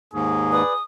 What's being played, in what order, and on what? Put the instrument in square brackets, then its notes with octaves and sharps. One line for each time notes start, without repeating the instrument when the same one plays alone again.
[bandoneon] D#2 G#2 [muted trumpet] G#4
[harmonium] B4 D5 [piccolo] D#6